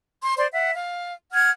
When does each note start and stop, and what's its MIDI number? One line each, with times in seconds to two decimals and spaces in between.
0.22 0.34 84
0.37 0.46 72
0.37 0.46 74
0.37 0.46 84
0.53 0.71 76
0.53 0.71 78
0.75 1.12 77
1.33 1.50 78
1.33 1.50 89
1.33 1.50 92